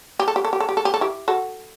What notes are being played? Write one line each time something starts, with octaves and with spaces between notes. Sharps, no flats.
G4
A4
G4
A4
G4
A4
G4
A4
G4
A4
E4 G4
F#4 A4